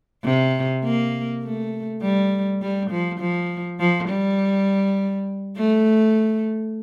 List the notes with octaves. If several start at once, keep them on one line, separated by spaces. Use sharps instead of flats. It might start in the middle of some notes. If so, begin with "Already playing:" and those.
C3
A#3
A3
G3
G3
F3
F3
F3
G3
A3